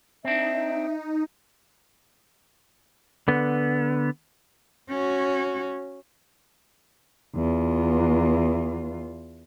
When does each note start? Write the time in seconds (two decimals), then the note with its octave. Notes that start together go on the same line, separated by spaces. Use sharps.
0.25 C4 D4 D#4 E5
3.28 D3 B3
4.89 C#4 F#4
7.36 E2 F4